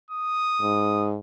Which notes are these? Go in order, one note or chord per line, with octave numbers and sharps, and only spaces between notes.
D#6
G#2